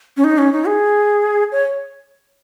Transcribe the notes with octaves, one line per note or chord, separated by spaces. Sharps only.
C#4
D#4
C#4
D#4
G#4
C#5